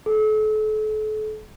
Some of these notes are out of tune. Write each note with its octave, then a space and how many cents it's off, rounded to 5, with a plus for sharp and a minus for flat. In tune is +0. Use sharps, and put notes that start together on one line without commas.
A4 -40